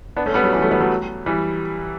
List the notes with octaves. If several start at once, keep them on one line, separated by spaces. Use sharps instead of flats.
B3 D4
A3 C#4
G3 B3
F#3 A3
E3 G3
F#3 A3
G3 B3
F#3 A3
E3 G3